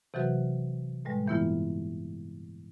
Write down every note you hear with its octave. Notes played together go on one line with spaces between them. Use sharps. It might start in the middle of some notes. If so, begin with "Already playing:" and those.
C3 E3 F#3 F#4 B4
A2 D3 G3 G#3 B4
G2 E3 A#3 B3 E4 F4